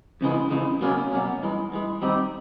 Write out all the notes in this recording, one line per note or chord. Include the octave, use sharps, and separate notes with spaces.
F2 C#3 E3 G#3
F2 C#3 E3 G#3
B2 F#3 A#3 C#4
B2 F#3 A#3 C#4
G2 E3 G#3
G2 E3 G#3
D#3 G3 C4 D#4 G4